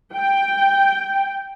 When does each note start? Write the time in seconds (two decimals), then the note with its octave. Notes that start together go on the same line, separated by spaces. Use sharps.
0.15 G5